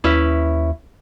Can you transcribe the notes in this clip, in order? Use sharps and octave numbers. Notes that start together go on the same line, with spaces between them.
D#2 C#4 E4 B4